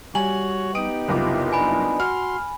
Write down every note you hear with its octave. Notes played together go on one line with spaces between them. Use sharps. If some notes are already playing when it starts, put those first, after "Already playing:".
G3 F#4 C#5 G#5 F#7
B3 D#4 G4 D#6 D7
F#1 C2 E4 F4 D6
B3 D4 D#4 G#5 B5
F#4 C6 F6